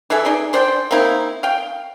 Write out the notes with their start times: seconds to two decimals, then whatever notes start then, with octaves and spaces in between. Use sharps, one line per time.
0.10 E3 G#4 A4 E5
0.25 D#4 G#4 D5
0.53 D4 C5 D5 G5
0.91 A#3 C4 D#4 E4
1.43 F5 G5